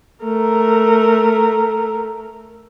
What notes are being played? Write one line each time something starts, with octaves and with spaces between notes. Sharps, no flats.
A3 A#4